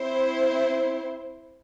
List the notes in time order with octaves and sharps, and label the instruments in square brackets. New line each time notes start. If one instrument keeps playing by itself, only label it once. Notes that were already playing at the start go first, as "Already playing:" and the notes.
Already playing: [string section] C4 E4 C5